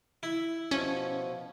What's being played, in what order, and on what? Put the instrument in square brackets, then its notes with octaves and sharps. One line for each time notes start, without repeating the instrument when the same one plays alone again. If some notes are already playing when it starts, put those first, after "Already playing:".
[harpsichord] E4
[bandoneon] B2 F3 [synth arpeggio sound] C#4